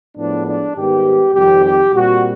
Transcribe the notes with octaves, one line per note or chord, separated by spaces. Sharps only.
A2 F3 G#3 B3 D4
D4
G#2 D#3 G3 B3 G4
F2 C3 D#3 G3 G4
G4
A#2 G3 C4 F#4